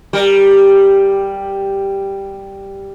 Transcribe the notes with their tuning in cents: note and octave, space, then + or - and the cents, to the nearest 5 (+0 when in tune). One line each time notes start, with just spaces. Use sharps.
G3 +0 A#4 +0